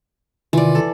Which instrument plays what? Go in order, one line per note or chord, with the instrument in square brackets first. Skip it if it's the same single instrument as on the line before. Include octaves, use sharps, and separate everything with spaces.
[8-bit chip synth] C3 D#3 F4 [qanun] E3 D5
[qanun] A4